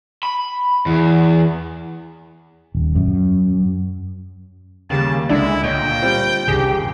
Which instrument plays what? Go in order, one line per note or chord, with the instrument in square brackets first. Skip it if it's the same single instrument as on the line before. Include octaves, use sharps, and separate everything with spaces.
[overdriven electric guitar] B5
E2
[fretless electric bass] D#1
F#2
[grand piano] D#2 G3 A#3 [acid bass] C#3 [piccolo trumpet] A5
[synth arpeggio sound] C#2 D4 D5 [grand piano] D3 [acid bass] G#3 [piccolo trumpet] E4
[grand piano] D2 C#5 D#5 [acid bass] A#2 [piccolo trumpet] G5
[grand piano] G3 C4 F4
[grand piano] D#1 G#4 [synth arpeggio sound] C2 G2 A#6 [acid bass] G4